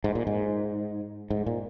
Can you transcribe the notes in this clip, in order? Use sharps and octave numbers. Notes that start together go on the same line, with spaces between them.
G#2
A#2
G#2
G#2
A#2